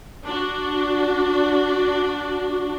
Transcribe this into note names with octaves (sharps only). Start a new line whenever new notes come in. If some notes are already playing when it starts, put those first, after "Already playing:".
D4 F#4